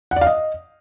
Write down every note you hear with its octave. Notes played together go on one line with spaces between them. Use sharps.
F#5
D5
F5
D#5